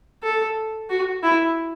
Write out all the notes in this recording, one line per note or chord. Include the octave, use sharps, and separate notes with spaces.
A4
F#4
E4